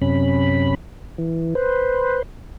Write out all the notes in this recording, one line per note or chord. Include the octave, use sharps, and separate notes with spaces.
F#2 C3 C#4 B5
E3
B4 C5